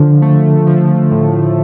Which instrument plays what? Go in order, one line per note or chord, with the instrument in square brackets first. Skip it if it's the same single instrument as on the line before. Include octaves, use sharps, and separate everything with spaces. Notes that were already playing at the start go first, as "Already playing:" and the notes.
Already playing: [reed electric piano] D3 [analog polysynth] F3
[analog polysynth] A3
F3
A2